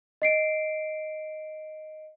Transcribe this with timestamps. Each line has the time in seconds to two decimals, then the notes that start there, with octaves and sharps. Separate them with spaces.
0.22 D#5 C7 D7